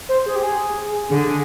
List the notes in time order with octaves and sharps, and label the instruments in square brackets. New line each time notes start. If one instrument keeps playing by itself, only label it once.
[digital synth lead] C5
G#4
G4
G#4
[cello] D3 [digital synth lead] G#4